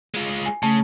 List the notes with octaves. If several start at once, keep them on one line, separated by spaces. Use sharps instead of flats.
G#3 F4
G#5
C#3 A3